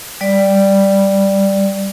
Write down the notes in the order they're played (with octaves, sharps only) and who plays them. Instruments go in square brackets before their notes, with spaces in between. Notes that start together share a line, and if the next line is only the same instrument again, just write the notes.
[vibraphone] G3 D5